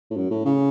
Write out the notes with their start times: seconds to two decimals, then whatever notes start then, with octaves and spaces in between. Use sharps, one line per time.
0.10 A2
0.17 F#2
0.30 A2
0.45 C#3